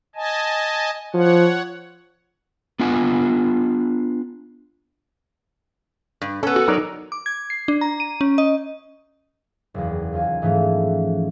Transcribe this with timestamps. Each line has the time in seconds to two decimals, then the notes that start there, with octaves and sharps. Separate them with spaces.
0.16 D#5 G#5 A5
1.14 F3 C#5 F#5
2.79 B3 D4 F4 F#5 G#5
6.21 G2
6.43 B3 C#4 A4
6.56 F#4
6.68 F#3 D#4 A#4 D5
7.12 D6
7.26 G#6
7.50 C7
7.68 D4
7.81 A#5
8.00 D#7
8.21 C#4
8.38 D#5
9.74 F#1 E2
10.13 D#2 F4 G#5
10.42 G#2 E3 F3 A3 C#4